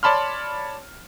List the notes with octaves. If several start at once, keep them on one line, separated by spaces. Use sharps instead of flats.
C#5 D5 A5 B5 C6 F6